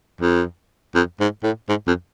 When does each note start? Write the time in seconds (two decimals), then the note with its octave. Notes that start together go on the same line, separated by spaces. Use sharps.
0.21 F2
0.95 F2
1.20 G#2
1.43 A2
1.69 G#2
1.87 F2